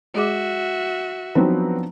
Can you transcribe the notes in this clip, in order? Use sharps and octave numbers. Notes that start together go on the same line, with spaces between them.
G#3 F#4 G#4 E5 D6
F3 F#3 B3 C4 D4 D#4 B4